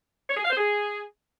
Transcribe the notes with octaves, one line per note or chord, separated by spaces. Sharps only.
C#5
G#4
F5
C5
G#4